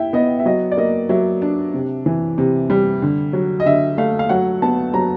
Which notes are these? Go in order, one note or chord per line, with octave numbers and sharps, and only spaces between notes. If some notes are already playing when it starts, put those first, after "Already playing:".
Already playing: E4 E5 G5
B3 D#5
E5
F#3 D#5
D5
A#3 D#5
F#3 E5
D4
C3
E3
C3
G3
D3
F#3
D#5
D3 E5
A3 F5
F5
F#3 F#5
B3 A5
F#3 A#5